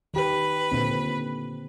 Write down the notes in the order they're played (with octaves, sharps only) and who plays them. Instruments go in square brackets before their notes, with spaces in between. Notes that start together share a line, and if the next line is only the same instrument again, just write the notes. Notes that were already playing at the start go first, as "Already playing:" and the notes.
[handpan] D#3 G4 [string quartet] B4
[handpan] A#2 D3 C4